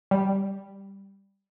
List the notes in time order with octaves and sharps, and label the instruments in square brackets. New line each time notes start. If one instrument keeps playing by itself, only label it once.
[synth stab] G3